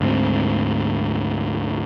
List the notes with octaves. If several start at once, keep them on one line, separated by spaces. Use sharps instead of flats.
D2 G#2 G#3 C4